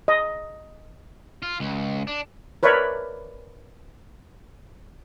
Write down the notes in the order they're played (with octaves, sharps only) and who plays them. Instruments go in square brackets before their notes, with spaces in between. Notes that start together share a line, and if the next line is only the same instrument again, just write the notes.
[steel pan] D#5
[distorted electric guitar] F4
C#2
D4
[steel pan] A#4 B4 C#5 D5 E5